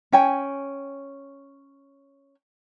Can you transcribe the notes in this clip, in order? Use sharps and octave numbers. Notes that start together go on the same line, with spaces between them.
C#4 G5 G#5